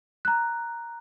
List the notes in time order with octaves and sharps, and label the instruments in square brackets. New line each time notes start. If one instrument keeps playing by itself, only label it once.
[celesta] A#5 F#6